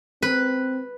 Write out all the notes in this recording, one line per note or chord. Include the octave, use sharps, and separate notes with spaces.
C4 B4